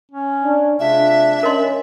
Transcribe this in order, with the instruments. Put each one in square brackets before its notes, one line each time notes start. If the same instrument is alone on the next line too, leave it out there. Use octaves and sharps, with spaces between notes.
[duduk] C#4
[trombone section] D4
[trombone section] C3 G#3 F4 [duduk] D4 [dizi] E5
[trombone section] C#4 [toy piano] A#4 D#5 C6